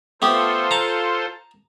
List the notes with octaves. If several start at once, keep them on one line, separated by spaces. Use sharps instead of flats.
A3 B3 F4 G4 A4 C5
A5 A#5